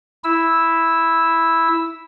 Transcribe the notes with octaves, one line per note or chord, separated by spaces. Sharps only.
E4 E6